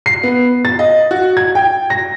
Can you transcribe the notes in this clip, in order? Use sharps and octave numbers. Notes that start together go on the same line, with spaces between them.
C7
B3
A6
D#5
F#4
G#6
G5
A#6